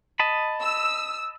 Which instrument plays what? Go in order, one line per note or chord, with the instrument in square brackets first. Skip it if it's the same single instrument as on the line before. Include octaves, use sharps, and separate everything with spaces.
[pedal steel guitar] D#5 A5 B5
[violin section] E6